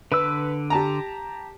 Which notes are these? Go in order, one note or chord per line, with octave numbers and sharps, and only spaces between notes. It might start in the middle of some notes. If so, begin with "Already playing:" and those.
D3 B4 E6
G4 A5 A#5